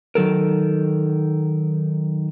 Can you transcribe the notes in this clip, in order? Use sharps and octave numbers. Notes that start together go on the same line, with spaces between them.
D#3 F#3 A4 A#4